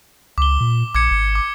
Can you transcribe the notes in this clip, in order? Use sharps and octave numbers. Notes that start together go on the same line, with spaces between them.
C#2 D6 G7
A#2
A#1 D6 G#6 C#7
G#1
D6